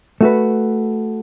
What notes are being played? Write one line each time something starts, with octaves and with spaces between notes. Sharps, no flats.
A3 F#4 B4